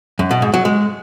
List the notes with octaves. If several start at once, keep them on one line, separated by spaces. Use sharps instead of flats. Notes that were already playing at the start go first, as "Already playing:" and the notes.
F#2
B2
G#2
F#3
G#3